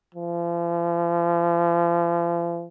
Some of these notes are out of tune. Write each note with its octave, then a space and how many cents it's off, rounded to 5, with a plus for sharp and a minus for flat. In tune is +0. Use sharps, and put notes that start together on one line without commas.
F3 -40